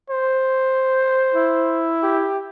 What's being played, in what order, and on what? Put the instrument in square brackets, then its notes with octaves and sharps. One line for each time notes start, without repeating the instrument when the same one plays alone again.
[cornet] C5
[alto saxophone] E4
[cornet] G4